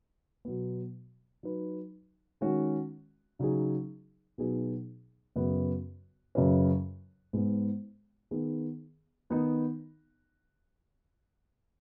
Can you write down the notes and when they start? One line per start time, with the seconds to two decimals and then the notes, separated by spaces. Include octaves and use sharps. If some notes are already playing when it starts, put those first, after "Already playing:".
0.45 B2 F#3 B3
1.43 F#3 D#4 B4
2.41 D#3 G#3 C#4 F#4
3.39 C#3 F#3 D#4 G#4
4.38 B2 F#3 B3 D#4 G#4
5.36 F#2 C#3 B3 F#4 B4
6.35 F#2 C#3 F#3 C#4 B4
7.33 G#2 G#3 B3
8.31 D#3 B3 G#4
9.30 D#3 B3 D#4